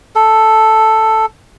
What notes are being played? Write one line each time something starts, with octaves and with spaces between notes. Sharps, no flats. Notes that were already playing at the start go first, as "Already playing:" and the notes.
A4